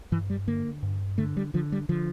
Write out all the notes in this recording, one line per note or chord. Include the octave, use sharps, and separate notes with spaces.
G2 E3
G3
D3 A#3
G2
D3 A3
G3
D3 F3
G3
D3 F3